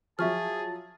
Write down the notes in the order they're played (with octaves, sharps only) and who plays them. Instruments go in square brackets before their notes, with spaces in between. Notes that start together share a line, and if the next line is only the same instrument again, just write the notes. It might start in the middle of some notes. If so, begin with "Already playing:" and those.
[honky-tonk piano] F3 F#3 [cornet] G#4 [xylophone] E5 C#6 F6 [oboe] A5